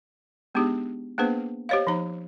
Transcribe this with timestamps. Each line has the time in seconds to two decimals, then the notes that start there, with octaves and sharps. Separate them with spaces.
0.55 G#3 B3 D4 D#4 G4 G#4
1.18 A#3 B3 D4 G#4 B4 C5
1.69 G4 C5 C#5 D#5 F5
1.87 F3 D#4 A#5